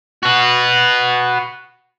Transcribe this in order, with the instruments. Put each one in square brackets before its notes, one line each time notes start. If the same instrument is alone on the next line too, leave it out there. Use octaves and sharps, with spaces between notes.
[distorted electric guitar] F#4 B4